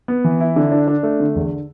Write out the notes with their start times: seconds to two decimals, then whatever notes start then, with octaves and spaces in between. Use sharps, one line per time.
0.08 B3
0.24 E3
0.40 E4
0.56 D3
0.72 D4
0.87 D4
1.03 A3
1.20 D3
1.35 E2